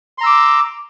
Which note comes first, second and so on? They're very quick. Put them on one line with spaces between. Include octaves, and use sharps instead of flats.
C6 A#5 E6 D6